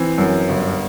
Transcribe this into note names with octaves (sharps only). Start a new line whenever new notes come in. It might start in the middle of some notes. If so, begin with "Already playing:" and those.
Already playing: E3 C4
F#2
G1